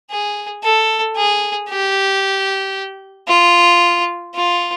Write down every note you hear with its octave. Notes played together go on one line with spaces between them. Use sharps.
G#4
A4
G#4
G4
F4
F4